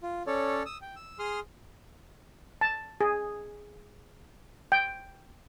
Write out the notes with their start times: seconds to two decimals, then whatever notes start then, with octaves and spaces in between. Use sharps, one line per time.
0.03 F4
0.27 C#4 A4 C#5 D5
0.65 D#6 E6
0.82 G5
0.96 E6
1.19 G#4 C6 D#6 F6
2.61 A5
3.01 G#4
4.72 G5